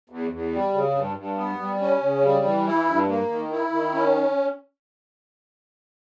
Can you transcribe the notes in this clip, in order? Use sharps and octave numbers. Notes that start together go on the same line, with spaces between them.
E2
E2
G3
C#3
G2
G2
B3
G3
C#4
C#3
G3
E3
E4
G2
A#3
D#3
E4
D#3
C#4